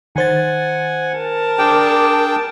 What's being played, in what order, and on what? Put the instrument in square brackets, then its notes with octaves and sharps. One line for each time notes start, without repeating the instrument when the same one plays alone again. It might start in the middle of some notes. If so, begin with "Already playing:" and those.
[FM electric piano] D#3 C5 A6 [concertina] F#5 G#5
[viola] A#4 A5
[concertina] D4 G#4 D5 [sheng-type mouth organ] G5